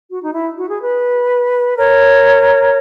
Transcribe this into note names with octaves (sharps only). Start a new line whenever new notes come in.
F#4
D#4
E4
F#4
G#4
B4
A#4 C#5